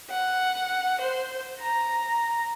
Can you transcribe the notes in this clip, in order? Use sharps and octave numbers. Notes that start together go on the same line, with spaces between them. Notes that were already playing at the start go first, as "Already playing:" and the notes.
F#5
C5
A#5